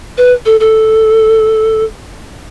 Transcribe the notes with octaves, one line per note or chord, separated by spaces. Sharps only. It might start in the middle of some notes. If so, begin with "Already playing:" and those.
B4
A4
A4